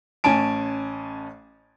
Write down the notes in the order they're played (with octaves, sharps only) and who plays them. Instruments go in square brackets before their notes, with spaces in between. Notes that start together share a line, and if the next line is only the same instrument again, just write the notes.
[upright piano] A1 C#4 G#5 A5 D7